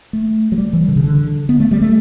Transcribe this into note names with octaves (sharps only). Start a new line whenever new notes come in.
A3
F#3
G3
E3
D3
C#3
D3
B3
A3
G3
A3